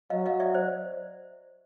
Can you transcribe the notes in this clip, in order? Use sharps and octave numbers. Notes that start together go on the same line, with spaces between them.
F#3 D#5 F5
D#5 F5
D5 E5
C5 D5